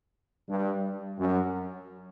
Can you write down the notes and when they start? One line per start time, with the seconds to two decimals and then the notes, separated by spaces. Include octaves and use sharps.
0.50 G2
1.19 F#2